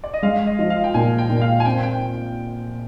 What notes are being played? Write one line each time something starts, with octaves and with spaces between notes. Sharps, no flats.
D5
D#5
G#3 F5
D#5
F3 D#5
F5
G5
A#2 G#5
G5
A#2
G5
F5
G#5
C4 G5
G5